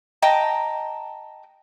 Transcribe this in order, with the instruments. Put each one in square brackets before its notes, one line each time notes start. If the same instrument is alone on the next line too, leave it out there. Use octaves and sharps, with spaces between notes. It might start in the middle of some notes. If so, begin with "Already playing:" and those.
[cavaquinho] D#5 G5 A5 A#5